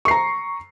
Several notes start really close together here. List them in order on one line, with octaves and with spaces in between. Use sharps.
C#6 C7 A#5